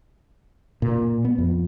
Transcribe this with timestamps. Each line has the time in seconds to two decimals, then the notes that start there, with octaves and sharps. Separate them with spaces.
0.82 A#2
1.25 B3
1.38 F2